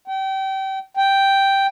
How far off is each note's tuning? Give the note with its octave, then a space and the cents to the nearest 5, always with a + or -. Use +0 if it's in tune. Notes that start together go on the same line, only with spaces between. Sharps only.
G5 -30
G5 +0